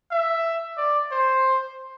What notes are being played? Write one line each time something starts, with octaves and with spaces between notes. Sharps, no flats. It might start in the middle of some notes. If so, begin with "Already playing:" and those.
E5
D5
C5